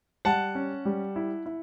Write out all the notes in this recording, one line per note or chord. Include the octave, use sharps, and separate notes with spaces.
G3 F#5 A5
C#4
G3
E4
E4